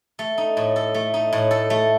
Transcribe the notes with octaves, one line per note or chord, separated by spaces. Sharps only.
A3
D#4
A2
A4
A3
D#4
A2
A4
A3